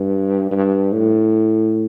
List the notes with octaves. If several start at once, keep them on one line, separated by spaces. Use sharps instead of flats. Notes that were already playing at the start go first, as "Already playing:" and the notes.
Already playing: G2
G2
A2